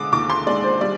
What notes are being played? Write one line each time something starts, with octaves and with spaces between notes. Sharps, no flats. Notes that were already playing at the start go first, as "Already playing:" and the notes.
Already playing: D3 G#3 D6 D#6
D#2 D6
C6
G#3 D5
C5
G3 D5